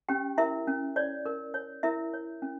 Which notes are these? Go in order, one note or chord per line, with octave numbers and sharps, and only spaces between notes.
C#4 G4 G5
E4 A#4 E5
C#4
C#5 D5
A#4
C#5
E4 A#4 E5
C#5
C#4